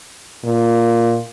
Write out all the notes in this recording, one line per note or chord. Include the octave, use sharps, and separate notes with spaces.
A#2